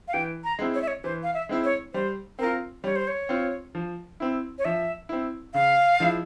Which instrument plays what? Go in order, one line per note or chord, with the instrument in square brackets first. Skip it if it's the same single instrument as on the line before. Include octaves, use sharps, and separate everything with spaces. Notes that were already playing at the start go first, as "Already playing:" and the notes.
[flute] F5
[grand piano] E3 [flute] G5
[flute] A#5
[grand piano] G#3 C4 E4
[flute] C#5
E5
C#5
[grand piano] E3 [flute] C5
[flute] F5
E5
[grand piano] G#3 C4 E4
[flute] C#5
[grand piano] G3 [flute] C5
[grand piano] C4 F4 [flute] A#4
[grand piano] G3 [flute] C#5
[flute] C5
C#5
[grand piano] C4 F4
F3
C4 E4
[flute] C#5
[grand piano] F3 [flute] E5
[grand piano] C4 E4
[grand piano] C#3 [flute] F5
[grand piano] F3 G#3 E4